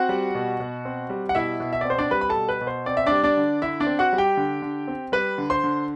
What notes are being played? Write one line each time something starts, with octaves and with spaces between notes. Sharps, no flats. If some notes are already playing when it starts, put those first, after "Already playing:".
Already playing: C4 F#4 F#5
G3
B2
B2
C4
G3
F#5
B2 E4 E5
B2
E5
D5
C4 C5
D4 D5
G3 B4 B5
B5
A4 A5
B2
B4
B2
C5
C4 D5
E5
D4 D5
G3
D4 D5
D3
D3 E4 E5
D4 D5
C4
F#4 F#5
G3
G4 G5
D3
D3
C4
G3 B4 B5
D3
C5 C6
D3